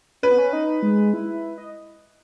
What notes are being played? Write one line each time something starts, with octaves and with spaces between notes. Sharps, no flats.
C#4 B4
B3
C#4
D#4
G#3
E4
D#5